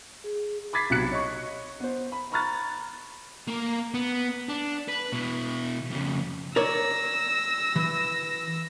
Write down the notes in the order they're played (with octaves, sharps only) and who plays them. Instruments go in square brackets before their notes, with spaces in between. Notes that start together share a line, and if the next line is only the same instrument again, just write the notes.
[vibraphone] G#4
[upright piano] B5 D6 G#6 A6 B6 C7
B1 C3 B3 F#6 C#7
C#5 D#5 C#6
B3 C5
B5
A#5 B5 C#6 F6 F#6 A6
[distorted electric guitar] A#3 A#4
B3
D4
B4
B2 E4
F2 C#3
[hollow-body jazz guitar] A#4 C#5 D5 [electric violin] E6 A#6
[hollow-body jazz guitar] E3